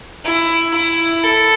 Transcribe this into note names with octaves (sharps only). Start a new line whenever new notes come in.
E4
E4
A4